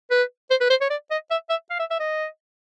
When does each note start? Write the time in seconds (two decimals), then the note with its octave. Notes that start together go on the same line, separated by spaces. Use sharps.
0.11 B4
0.50 C5
0.61 B4
0.70 C5
0.81 C#5
0.90 D5
1.11 D#5
1.30 E5
1.50 E5
1.70 F5
1.79 E5
1.90 E5
2.00 D#5